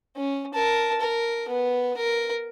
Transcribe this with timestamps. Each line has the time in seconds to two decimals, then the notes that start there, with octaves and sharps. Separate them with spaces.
0.16 C#4
0.54 A#4 A5
1.01 A#4
1.48 B3
1.97 A#4